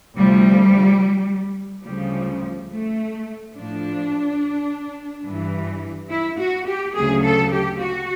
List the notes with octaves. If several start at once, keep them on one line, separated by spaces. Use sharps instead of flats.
D2 C3 F3 G3
D2 C#3 F3 G3
A3
A2 F3 D4
G2 E3
E4
F#4
G4
D2 C#3 F#3 G#4
A4
G4
F#4